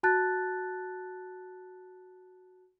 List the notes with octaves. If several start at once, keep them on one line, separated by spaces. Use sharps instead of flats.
F#4 A5 F#6 A6